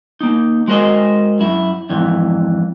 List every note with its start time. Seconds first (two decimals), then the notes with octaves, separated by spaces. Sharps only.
0.21 A#3 D#4
0.68 G#3 F#4 A#4 C5 D#5
1.39 F#2 E4
1.90 F2 G#2 E3